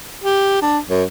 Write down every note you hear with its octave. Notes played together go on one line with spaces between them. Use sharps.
G4
D4
F#2